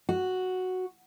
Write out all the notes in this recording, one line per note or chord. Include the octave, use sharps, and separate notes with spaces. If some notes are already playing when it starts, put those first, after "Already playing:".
F#4